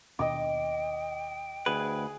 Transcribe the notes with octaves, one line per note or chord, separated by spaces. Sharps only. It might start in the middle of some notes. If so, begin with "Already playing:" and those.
D#2 B2 D4 D#5 G5 D6
D2 G#4 B4